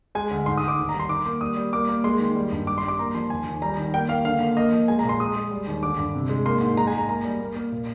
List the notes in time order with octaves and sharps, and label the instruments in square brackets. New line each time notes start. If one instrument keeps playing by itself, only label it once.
[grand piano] G#3 G#5
D2
G#2 C6
D#6
G#2
D6
D#2
A#5
G3
C6
D#3 D6
A#3
G3 D#6
G3
A#3 D6
A#3
G#3 C6
D#3
G3
G2
G3 D6
C6
G3
D6
A#3 A#5
F3 C6
D#2 G#5
D#2
G3 A#5
D#3
A#3 G5
A#3 F5
D3 F5
A#3
A#3 D#5
F3
G#3 G#5
A#5
A#2
C6
G#3 D#6
G#3
G3
D#2
D3 D6
G2
C3
G#3
A#3 C6
G#2
G#3 A#5
G#5
G#3
A#5
A#3 A#5
G3
A#3
A#3
A#2